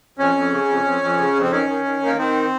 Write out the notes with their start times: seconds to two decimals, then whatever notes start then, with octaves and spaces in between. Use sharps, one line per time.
0.18 F2 C#4
0.35 F2
0.52 C#3
0.68 F2
0.84 F2
1.02 F2
1.18 C#3
1.35 F2
1.42 C4
1.51 D#3 C#4
1.68 D#3
1.85 D#3
2.01 D#3
2.06 A#3
2.17 D#3 C4